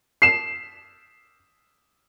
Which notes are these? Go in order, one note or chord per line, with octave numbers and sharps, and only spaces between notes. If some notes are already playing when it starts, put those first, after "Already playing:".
C7 E7